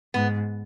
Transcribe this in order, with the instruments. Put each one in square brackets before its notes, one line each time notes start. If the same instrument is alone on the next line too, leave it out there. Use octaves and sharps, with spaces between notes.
[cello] G#2 [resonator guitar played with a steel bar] B3